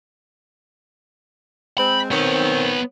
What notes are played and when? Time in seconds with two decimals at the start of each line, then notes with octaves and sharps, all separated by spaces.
1.78 G#3 C4 B5
2.11 D#3 B3 C4 C#5